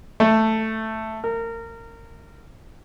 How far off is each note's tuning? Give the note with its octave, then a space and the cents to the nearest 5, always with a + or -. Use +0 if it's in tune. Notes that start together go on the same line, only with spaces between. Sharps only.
A3 +5
A#4 -25